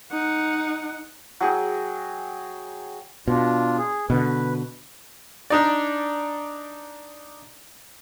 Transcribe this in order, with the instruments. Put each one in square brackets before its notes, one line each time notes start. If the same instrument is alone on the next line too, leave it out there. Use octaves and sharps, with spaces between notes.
[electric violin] D#4 F#5
[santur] F#3 G#4 G5
[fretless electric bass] B2 [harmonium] D4 F4
[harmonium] G#4
[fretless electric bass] B2 D3 [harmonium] B4
[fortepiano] D4 D#4 D5